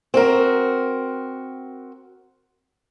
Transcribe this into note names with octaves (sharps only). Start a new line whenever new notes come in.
C4 F#4 A#4